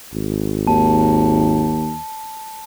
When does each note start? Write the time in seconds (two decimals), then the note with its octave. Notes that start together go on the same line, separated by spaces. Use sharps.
0.13 G#1
0.67 D#2 A5